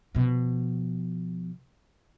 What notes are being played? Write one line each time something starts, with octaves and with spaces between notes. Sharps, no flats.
B2 F3